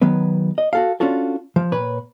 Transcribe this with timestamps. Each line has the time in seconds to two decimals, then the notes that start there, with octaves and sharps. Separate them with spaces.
0.02 D#3 F#3 B3 B4
0.58 D#5
0.73 F#4 A4 F5
1.00 C#4 D4 F4 F#4 A4
1.56 F3
1.72 A#2 B4 C#5